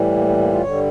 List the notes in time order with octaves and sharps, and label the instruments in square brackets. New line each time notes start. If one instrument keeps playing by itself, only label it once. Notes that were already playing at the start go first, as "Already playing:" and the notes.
Already playing: [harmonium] A2 E3 G3
A#3
A#3
A#3
F4
G2 D3 G3 C#5